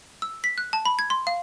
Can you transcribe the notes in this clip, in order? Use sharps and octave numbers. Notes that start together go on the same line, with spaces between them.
E6
B6
F#6
A5
B5
G#6
C6
F5